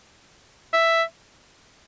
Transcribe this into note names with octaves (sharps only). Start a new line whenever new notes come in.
E5